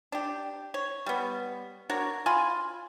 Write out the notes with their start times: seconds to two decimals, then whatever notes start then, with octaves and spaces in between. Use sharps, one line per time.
0.12 D4 G4
0.74 C#5
1.06 G3 B3
1.90 D4 F#4 A#4 C#5
2.26 F4 G#5 B5 C6